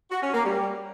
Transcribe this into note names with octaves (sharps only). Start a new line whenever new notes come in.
F#4
C#4
A#3
G3